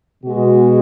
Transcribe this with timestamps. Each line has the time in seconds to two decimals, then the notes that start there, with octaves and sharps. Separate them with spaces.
0.24 B2 G#3 F#4